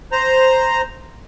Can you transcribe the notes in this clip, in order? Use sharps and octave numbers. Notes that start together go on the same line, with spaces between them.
C5 A#5